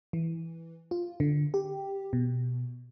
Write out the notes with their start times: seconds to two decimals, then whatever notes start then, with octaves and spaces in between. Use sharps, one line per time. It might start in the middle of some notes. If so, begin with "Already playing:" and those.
0.13 E3
0.91 F4
1.20 D3
1.54 G4
2.13 B2